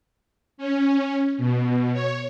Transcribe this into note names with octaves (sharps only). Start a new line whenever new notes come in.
C#4
B2
C#5